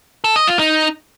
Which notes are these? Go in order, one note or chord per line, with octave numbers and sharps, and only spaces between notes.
A4
D#5
F4
D#4